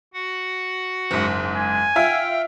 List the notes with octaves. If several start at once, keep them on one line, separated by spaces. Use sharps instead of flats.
F#4 F#5
F#1 G#2
G#5
F4 E5 G5